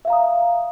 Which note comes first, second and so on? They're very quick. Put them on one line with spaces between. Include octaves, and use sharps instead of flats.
E5 F5 A#5 D#6